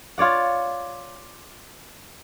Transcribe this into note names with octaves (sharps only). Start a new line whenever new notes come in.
F4 C#5 D5 F#5